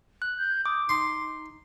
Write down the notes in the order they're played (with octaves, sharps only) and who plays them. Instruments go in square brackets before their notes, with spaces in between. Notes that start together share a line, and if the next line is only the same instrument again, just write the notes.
[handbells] F#6
[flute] G6
[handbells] D6 [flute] D#6
[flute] D#4 [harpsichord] C6